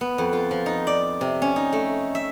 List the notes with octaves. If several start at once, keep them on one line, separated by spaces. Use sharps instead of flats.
B3
F2
F4
F3
D#4
D5
C3
C#4
D#4
A3
E5